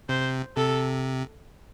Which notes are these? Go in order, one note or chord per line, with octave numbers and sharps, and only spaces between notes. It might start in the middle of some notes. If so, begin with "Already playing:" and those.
C3 C5
C3 A4